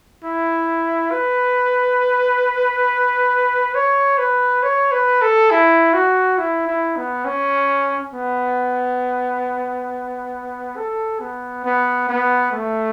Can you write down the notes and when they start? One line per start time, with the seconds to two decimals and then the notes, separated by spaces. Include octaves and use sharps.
0.24 E4
1.11 B4
3.75 C#5
4.18 B4
4.63 C#5
4.91 B4
5.21 A4
5.51 E4
5.93 F#4
6.38 E4
6.67 E4
6.96 B3
7.25 C#4
8.14 B3
10.77 A4
11.20 B3
11.65 B3
12.09 B3
12.52 A3